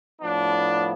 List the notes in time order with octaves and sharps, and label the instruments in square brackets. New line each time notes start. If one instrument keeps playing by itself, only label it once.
[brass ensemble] A2 F3 B3 D4